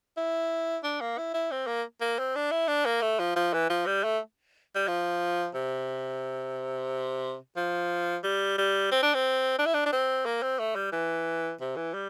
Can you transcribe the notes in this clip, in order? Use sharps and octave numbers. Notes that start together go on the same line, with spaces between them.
E4
D4
A#3
E4
E4
C4
A#3
A#3
C4
D4
E4
D4
A#3
A3
F3
F3
E3
F3
G3
A3
G3
F3
C3
F3
G3
G3
C4
D4
C4
D4
E4
D4
D4
C4
A#3
C4
A3
G3
E3
C3
E3
G3